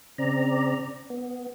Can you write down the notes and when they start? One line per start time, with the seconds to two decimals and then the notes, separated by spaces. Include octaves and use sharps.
0.18 C#3 C4 D5 A#5
1.10 B3